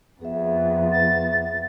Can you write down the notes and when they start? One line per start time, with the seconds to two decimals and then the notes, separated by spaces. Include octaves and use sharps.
0.21 F2 B3 G#4 E5
0.92 A6